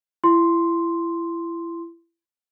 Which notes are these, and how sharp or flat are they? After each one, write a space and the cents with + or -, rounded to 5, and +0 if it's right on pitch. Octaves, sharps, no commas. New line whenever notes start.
E4 +30 C6 +0